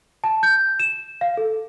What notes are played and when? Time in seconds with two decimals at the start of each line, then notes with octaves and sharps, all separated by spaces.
0.24 A5
0.43 G6
0.80 E7
1.21 F5
1.37 A4